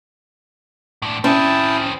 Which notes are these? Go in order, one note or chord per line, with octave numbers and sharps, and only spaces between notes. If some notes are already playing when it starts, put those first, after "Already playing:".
A2 D4
C4 C#4 E4 G#4 G5 A5